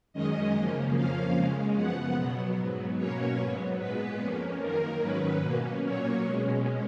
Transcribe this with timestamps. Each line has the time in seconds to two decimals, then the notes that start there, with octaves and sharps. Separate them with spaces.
0.13 F#2 D#3 G#3 C#4 D#5
0.55 F#2 C#3 F3 A#3 C#4
0.95 F2 F3 A#3 C#4 F5
1.35 C#3 G#3 C#4
1.75 F#2 F3 B3 F#5
2.17 B2 F#3 B3
2.57 G#2 F#3 B3
2.97 B2 F#3 A#3 C#4 C#5
3.39 G#2 F#3 B3
3.79 A#2 G#3 B3 B4
4.20 F2 F3 A#3 C#4
4.60 F#2 D#3 A#3 A#4
5.01 G#2 D#3 F#3 C#4 B4
5.42 B2 A#3 C#4
5.82 A#2 F#3 A#3 C#4 C#5
6.23 B2 G#3 C#4